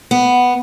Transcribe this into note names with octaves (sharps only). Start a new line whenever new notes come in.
B3